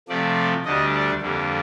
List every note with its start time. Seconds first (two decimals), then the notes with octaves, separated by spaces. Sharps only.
0.08 C3 F3 A3 D5
0.65 D2 D3 G3 D4 D#5
0.94 D5
1.22 F2 D3 G3 A#3